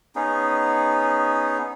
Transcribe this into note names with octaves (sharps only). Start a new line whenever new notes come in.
B3 C#4 D#4 G#4